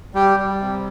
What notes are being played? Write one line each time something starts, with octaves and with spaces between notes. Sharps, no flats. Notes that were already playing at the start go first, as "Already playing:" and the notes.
G3 G4
G3
C3